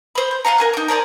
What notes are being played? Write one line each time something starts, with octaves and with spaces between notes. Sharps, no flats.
C5 B5
G6
F4 F5 F#5 A#5
A#4 G#5 F#6
D#4 D6
A#4 C5 D5 G#5